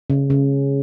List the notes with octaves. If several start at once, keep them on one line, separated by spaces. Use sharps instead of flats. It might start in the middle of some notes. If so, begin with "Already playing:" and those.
C#3
C#3